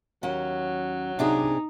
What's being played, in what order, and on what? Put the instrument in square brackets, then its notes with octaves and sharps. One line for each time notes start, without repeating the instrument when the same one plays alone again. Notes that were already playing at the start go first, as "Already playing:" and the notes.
[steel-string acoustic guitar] D#2 C#4 [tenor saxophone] F#3
[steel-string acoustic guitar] C3 D4 G#4 [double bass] D#4